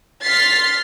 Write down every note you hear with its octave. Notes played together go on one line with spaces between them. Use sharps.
C6 F6 A6 B6 C7